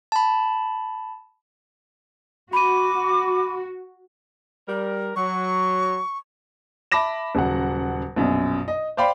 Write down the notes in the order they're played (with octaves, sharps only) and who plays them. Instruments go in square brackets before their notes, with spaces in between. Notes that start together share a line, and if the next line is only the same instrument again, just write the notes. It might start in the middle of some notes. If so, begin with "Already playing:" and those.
[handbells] A5 B5
[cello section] F#4 [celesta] B5 D#7 [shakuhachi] D6
[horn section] G3 A#4
[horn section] F#3 [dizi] C#6
[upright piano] E5 A5 B5 D6 A#6 E7
D#1 C#3 F#3 F#5
A#1 F#2 B2
D#5
C5 D5 F5 G5 B5